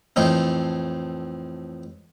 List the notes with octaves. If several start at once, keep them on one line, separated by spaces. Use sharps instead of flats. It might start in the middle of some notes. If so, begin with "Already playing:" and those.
F2 A2 E3 C4 D#4